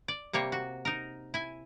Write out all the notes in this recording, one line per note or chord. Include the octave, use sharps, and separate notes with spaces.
D5
C3 G3 A#3 C#5
F#4
D#4 A#4
E4 G#5